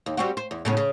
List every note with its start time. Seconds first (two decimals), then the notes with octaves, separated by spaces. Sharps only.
0.06 D#2
0.17 G3 C4 F#4
0.37 C5
0.51 E2
0.65 A2 C#3 B3
0.77 C#3